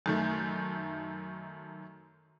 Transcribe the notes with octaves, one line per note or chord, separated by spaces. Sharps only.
F#2 D#3 A3